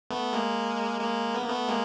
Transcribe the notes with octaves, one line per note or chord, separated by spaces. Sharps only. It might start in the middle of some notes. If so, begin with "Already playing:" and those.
A3 B3
G#3 A#3
G#3 A#3
B3
A#3
A3 B3
G#3 A#3